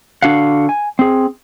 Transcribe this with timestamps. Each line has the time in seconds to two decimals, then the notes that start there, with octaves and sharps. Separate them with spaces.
0.22 D3 D4 F#4 F5 F#5
0.69 G#5
0.99 C4 G#4